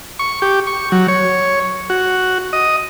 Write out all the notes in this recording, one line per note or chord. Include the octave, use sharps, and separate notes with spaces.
C#6
G4
C#6
F#3
C#5
F#4
D#5